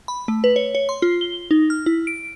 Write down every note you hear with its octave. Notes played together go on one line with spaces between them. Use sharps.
B5
A3
B4
C#5
C#5
C6
F4
G7
D#4
F6
E4
D7